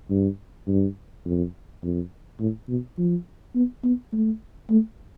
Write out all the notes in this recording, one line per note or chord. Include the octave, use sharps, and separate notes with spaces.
G2
G2
F2
F2
A2
B2
F3
B3
B3
A3
A3